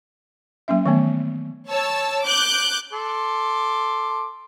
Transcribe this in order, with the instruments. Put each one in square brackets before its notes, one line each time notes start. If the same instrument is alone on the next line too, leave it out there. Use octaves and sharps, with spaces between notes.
[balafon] F#3 A#3 C#4 E5
D#3 E3 F#3 A3 B3
[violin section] C#5 A5 E6
D6 F#6 G6
[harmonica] A4 C6 D6